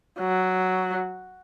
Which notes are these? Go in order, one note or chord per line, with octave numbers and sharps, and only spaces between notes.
F#3